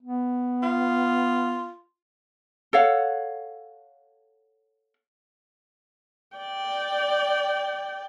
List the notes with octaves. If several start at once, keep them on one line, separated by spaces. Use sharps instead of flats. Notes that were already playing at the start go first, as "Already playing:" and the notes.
B3
F4
A4 C#5 F5 F#5
D5 G5